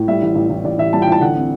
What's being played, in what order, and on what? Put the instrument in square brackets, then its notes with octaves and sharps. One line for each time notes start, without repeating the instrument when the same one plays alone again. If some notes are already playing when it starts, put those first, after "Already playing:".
Already playing: [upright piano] A2
G3 E5
A1
A1
A1
A1 D5
A1 E5
G3 A5
G5
A1 A5
D3 F#5
C4